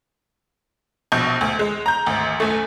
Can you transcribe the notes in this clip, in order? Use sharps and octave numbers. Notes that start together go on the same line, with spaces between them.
A#1 B2 C#6 G6
D2
G#3
A#5 G6
G#1 D2
F#1 A3